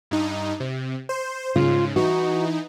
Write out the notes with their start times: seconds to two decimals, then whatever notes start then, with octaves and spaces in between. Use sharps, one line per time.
0.11 G2 D#4
0.60 C3
1.09 C5
1.56 G#2 C#3 F4
1.96 E3 D#4 F#4